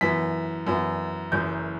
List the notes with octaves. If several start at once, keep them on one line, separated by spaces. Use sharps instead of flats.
F#2 E3 B3 B6
F#2 E3 B3
F#1 F#2 E3 G6